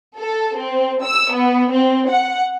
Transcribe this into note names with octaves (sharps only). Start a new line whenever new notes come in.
A4
C4
E6
B3
C4
F#5